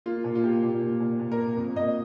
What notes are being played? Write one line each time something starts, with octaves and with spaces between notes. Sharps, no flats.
A#3 F4
A#2
F4
A#3 G4
A#2
A#2
A#2
A#2
A#4
A#3
F2
F2 D#5